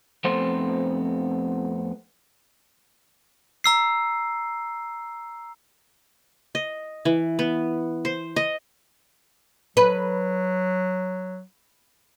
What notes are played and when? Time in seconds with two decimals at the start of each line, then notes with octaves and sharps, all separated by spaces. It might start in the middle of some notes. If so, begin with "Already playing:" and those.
0.24 F2 A3 B3 C4 C5
3.64 A#5 E6 C7
6.55 D#5
7.05 E3
7.39 B3
8.05 C5
8.36 D#5
9.77 F#3 B4